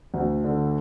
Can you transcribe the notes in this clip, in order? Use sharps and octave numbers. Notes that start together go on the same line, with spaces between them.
D2
D3